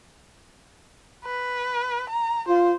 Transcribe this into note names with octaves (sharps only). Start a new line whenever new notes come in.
B4
A#5
F4 C5